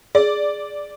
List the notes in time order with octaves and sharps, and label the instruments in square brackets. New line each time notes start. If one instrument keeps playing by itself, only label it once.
[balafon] G#4 [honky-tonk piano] D5